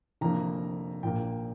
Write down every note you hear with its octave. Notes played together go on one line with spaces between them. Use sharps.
F1 F2 D3 A#3 A#5
A#1 A#2 A#3 G5